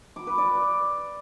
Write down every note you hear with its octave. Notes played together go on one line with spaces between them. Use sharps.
D6
B4
D5